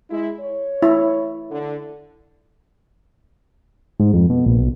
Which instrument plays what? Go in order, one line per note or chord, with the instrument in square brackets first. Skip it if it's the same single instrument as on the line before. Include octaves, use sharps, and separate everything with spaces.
[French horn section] G#3 E4
C#5
[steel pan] E4
[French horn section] D3
[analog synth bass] G#2
F2
B2
A#1
B1